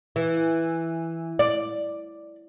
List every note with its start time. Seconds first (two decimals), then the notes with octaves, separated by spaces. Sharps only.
0.16 E3
1.39 D5